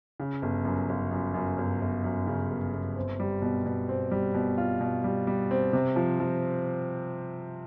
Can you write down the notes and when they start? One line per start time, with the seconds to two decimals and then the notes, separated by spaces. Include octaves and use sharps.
0.20 C#3
0.42 G1
0.65 F#2
0.89 G1
1.11 F#2
1.34 F#2
1.58 G1
1.82 G1
2.04 F#2
2.27 C#3
2.51 G1
2.73 G1
2.96 C4
3.20 G3
3.42 B2
3.66 B2
3.89 C4
4.11 G3
4.34 B2
4.58 F4
4.80 B2
5.04 G3
5.27 G3
5.51 C4
5.73 C3
5.96 F3
6.20 F3